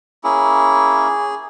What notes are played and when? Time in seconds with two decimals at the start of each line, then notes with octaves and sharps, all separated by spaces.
0.24 A#3 C#4 E4 G#4